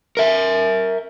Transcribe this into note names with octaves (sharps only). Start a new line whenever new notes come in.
A#4 E5